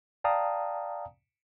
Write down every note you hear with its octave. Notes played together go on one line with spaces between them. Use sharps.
D5 F5 G5 A5 A#5 D#6